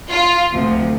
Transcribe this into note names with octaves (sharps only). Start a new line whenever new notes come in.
F4
D2 C3 F3